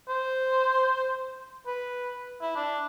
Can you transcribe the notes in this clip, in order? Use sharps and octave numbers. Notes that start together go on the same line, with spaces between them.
C5
B4
E4
D4